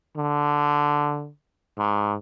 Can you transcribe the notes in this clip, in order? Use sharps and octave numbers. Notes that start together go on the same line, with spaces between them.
D3
G#2